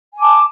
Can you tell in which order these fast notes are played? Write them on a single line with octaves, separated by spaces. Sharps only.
G#5 D6 A5